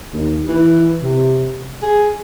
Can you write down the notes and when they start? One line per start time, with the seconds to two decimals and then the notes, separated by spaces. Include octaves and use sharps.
0.13 D#2
0.48 E3
1.02 C3
1.82 G#4